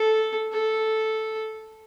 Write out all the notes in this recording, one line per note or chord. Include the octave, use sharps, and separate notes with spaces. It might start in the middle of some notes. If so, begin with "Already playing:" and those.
Already playing: A4
A4